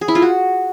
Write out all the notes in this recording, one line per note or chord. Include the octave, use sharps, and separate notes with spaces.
G#4
E4
F4
F#4